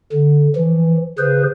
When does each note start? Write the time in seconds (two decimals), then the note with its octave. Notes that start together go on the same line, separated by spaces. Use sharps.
0.12 D3
0.56 E3 F3
1.18 C#3 G#4 B4 C5